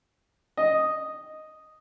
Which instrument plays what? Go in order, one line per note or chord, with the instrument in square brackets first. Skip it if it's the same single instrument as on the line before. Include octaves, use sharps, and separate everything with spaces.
[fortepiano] D#5